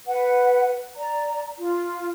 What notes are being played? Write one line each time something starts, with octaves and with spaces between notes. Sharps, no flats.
B4 F#5
D5 A#5
F4